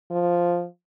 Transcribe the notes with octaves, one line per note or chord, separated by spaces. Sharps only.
F3